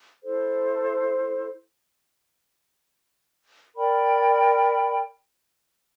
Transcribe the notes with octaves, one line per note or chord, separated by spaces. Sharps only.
E4 A4 C5
A#4 D5 G5 B5